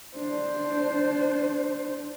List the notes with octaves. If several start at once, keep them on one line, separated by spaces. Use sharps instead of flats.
D4 C5